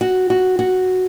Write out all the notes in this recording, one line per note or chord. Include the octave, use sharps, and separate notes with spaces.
F#4
F#4
F#4